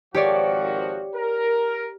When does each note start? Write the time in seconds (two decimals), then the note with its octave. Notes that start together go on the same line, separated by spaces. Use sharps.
0.14 G#1 F3 F#4 G4 C#5 D5
1.14 A#4